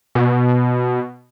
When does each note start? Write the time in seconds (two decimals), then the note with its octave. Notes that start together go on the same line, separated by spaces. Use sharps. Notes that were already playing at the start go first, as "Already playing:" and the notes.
0.15 B2